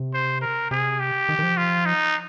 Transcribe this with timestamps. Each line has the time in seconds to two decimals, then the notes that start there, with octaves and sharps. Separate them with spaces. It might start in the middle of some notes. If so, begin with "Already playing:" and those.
Already playing: C3
0.14 C5
0.42 A#4
0.71 C3 G#4
1.00 G4
1.29 D#3
1.39 D#3
1.43 F3
1.57 F4
1.86 D#4